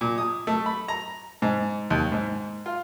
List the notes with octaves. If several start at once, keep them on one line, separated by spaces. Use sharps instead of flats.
A#2
D#6
A3
B5
A#5
G#2
D#2
G#2
F4